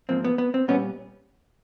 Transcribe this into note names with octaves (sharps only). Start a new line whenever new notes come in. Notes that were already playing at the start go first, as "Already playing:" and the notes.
G#2 F3 A#3 C4
B3
B3
C4
A#2 G3 B3 C#4